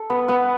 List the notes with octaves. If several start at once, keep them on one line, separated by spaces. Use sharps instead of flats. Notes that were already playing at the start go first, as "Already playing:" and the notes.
Already playing: A4
B3 B4
B3 B4